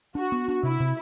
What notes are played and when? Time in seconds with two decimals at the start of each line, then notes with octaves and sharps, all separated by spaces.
0.15 D4 F#4
0.32 B3
0.48 D4
0.63 C3 E4
0.80 C3